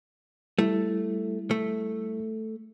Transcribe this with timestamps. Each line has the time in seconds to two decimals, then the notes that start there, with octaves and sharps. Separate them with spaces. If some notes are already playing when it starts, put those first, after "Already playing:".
0.59 G3 A3 E4
1.51 A3